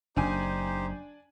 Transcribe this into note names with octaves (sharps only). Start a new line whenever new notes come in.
F#1 D4 D#4 G4 C5 G#5